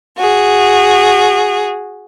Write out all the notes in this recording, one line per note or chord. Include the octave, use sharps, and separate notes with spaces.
F#4 G#4